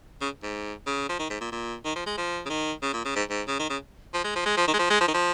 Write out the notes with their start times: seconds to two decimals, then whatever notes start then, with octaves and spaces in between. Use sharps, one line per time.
0.21 C#3
0.43 G#2
0.87 C#3
1.09 F3
1.19 D#3
1.30 G#2
1.41 A#2
1.52 A#2
1.85 D#3
1.96 F3
2.06 G#3
2.18 F3
2.46 C#3
2.49 D#3
2.82 C#3
2.93 A#2
3.05 C#3
3.16 G#2
3.30 G#2
3.48 C#3
3.59 D#3
3.70 C#3
4.14 F3
4.24 G#3
4.36 F3
4.46 G#3
4.57 F3
4.68 D#3
4.74 G#3
4.79 F3
4.90 G#3
5.01 F3
5.08 D#3
5.14 F3